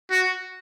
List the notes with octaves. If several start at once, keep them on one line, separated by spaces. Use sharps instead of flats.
F#4